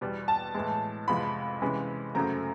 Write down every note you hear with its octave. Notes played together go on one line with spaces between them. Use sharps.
E2 B2 G3
A5
A2 E3 G#3
F2 C3 F3 G#3 B3 B5
C3 E3 G#3 C#4
F#2 C#3 F#3 A3 C4 A#5